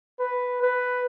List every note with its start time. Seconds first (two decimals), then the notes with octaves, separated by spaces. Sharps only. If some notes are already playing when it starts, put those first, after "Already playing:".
0.20 B4
0.62 B4